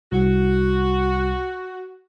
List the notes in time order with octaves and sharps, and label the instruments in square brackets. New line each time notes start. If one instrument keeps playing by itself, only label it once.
[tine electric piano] C2 [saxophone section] F#4